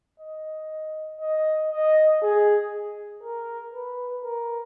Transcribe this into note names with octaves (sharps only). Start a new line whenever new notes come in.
D#5
D#5
D#5
G#4
A#4
B4
A#4